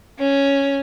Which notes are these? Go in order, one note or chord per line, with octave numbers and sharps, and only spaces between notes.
C#4